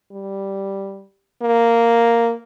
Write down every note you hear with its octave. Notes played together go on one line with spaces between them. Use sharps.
G3
A#3